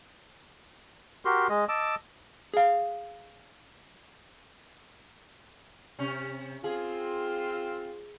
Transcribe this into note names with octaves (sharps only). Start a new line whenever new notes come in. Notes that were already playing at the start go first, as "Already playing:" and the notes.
F#4 G4 A#4 C6
G#3 D#5
D#5 A5 D6 E6
G#4 F5
C3 C#4
C4 F4 G#4